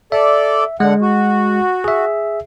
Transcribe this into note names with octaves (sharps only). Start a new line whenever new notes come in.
A4 D5 E5
D3 G#3 F#5
F#4
G#4 E5